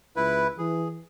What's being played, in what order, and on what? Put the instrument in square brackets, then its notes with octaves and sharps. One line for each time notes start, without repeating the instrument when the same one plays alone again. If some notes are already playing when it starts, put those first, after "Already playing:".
[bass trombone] C#2 [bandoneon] E4 B4
[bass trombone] E3 [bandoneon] G#4